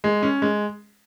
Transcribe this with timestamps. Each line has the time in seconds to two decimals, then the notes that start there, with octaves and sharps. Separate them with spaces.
0.04 G#3
0.23 C#4
0.42 G#3